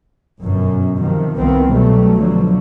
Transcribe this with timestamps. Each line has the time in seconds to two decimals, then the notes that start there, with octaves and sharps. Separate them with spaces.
0.42 G1 F#2 B2
0.99 C3 D#3 F3
1.37 C2 D#3 F3 B3 C4
1.69 B2 F#3 G3 A3
2.18 B2 D3 F3 F#3